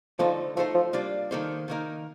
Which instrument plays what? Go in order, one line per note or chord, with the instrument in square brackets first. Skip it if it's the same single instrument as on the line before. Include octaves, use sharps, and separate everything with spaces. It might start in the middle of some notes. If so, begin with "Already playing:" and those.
[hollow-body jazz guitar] D3 A3 D#4 A4 [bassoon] F3
[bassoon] F3 [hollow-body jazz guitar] A3 D#4 A4 C5
[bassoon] F3
[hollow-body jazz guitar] G3 A#3 D4 F4
D#3 A#3 D#4 A4 C5
D#3 A#3 D#4 A#4